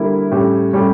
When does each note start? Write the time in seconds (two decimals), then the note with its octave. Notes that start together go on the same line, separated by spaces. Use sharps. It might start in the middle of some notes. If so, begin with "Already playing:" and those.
Already playing: D3 G3 A#3 E4
0.31 A2 G3 C#4 G4
0.73 A2 G3 C#4 G4